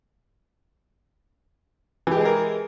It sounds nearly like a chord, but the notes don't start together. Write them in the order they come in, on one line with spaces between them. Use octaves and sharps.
E3 G4 G#3 G#4 A#4